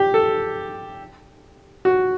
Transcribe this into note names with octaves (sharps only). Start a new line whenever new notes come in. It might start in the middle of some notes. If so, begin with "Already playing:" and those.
Already playing: G4
A4
F#4